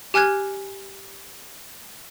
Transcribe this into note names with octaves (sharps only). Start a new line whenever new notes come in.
G4 G#5 F6 F#6 G#6